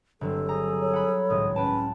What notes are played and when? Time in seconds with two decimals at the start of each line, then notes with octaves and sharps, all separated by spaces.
0.21 G1 F#3 C4 A4
0.49 G#4 A#5
0.81 C#5
0.94 F#5 B5
1.30 G#1 C#2 A2 D#5
1.56 C#4 B4 F#5 G5 A5